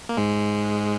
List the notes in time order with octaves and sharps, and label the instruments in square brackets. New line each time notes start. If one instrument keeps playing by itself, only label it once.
[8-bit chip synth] A#3
G#2 G#3